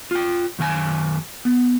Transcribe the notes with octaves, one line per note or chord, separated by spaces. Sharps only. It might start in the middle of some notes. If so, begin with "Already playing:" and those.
F4 G5
F#2 D#3 F5 G#5
B3